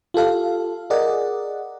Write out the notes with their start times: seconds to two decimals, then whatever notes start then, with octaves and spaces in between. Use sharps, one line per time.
0.14 F4 G4 A4 F5
0.90 G#4 A#4 D5 D#5 F#5